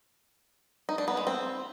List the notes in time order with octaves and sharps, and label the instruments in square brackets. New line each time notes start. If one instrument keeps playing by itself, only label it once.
[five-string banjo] D#4
D4
B3
G#3
C4